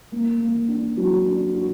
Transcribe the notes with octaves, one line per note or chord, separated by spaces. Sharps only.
A#3
A#3
D4
F#3
D4
F#4